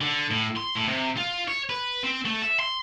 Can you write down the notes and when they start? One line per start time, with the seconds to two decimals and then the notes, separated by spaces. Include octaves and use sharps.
0.01 D3
0.31 A2
0.57 C6
0.76 A2
0.88 C3
1.17 F4
1.48 C#5
1.70 B4
2.04 C4
2.26 A3
2.42 E5
2.60 C6